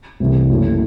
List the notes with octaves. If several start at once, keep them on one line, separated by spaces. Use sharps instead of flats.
C2 C3 E3 A3
F#1 F#2 E3 A3